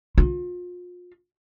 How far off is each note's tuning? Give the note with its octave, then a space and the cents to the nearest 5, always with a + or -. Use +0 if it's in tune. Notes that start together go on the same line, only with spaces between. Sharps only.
F4 +35